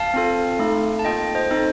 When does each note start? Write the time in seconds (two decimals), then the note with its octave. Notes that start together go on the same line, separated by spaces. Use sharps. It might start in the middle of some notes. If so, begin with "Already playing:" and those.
Already playing: F5 A5
0.14 C4 F4 A4
0.59 A3 D#4 A4
0.99 A5
1.05 A#3 F4 A4 D#5 G5
1.35 C5 D#5
1.51 C4 D#4 A4